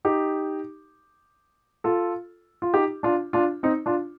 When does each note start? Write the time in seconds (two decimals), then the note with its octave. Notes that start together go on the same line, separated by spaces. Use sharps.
0.05 D#4 G4
1.84 F4 A4
2.62 F4
2.74 D#4 G4
3.03 D4 F4
3.33 D4 F4
3.63 C4 D#4
3.86 D4 F4